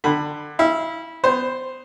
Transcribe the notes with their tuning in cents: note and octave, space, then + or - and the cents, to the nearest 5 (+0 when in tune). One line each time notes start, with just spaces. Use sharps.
D3 +25 B5 +0
E4 -20 F5 -40
B3 +25 C5 +0